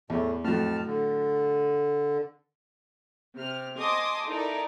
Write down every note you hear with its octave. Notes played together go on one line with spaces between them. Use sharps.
E2 A2 A3
F2 A2 F#3 A5 F6
D3
C3 F6
D#5 G#5 A5 C6 D6 D#6
D#4 E4 A4 A#4 D5